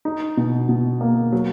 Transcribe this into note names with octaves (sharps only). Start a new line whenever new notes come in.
D#4
B2
B2
A#3
F#3